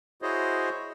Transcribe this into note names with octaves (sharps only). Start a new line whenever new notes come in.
E4 F#4 G#4 C5 C#5 D#5